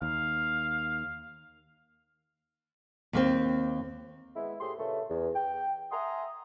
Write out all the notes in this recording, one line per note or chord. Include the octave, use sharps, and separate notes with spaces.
D#2 F5
D#2 A#3 C4
G#3 B3 E4
A2 G4 G#4 C6
G2 A#2 C#3 A3
E2
G5
E5 F#5 G#5 A#5 C6 D#6